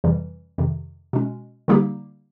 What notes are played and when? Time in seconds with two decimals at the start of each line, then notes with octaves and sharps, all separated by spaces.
0.04 F2 C3 E3 G3
0.58 F2 C3 D#3
1.13 B2 G#3 C#4
1.68 D3 G3 A#3 D#4 G4